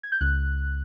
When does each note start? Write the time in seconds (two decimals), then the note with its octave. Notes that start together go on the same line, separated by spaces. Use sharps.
0.03 G#6
0.12 G6
0.21 C#2 F#6